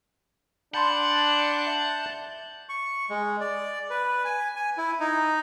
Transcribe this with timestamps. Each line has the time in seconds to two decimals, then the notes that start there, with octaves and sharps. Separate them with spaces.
0.74 D4 F#5 A5 B5 C6 G6
1.67 E5
2.69 C#6
3.10 G#3
3.41 D5
3.90 B4
4.25 G#5
4.56 G#5
4.78 E4
5.00 D#4